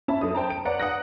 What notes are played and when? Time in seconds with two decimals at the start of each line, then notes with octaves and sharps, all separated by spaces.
0.08 C#4 E5 A5 B5
0.21 F#2 A4 D#6
0.35 C5 G5 A5 A#5
0.50 D7
0.65 B4 C#5 D5 F#5 A#5
0.80 F#5 D#6 F#6 A#6